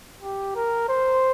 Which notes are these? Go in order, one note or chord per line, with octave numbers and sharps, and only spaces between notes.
G4
A#4
C5